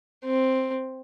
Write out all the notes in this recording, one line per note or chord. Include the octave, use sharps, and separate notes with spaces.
C4